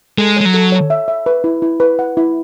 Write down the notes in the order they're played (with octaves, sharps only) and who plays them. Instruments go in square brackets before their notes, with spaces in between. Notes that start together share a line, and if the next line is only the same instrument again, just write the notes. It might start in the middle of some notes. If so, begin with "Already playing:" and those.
[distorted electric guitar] G#3 [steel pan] A4
[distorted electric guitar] G#3 [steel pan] C#5
[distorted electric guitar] F#3
[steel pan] A4
C#5
E5
E5
B4
E4
E4
B4
F#5
E4